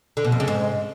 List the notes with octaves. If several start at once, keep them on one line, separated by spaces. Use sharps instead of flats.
D3
B2
F2
C#3
G#2